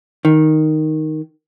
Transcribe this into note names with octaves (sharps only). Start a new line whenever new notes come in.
D#3